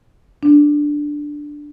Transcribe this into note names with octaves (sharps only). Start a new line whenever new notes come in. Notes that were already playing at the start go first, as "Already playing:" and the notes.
D4